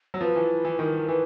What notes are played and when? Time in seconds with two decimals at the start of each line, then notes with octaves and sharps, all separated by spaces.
0.14 F#3
0.21 F3 B4
0.36 E3
0.65 E3
0.79 D#3 A#4
1.08 E3 B4